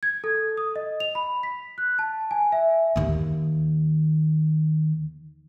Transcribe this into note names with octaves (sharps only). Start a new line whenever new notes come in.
G#6
A4
D#6
D#5
F7
B5
B6
F#6
A5
G#5
E5
D#2 D#3